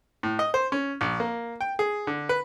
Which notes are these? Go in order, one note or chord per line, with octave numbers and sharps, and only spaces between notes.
A2
D#5
C5
C#4
A#1
A#3
G5
G#4
D3
B4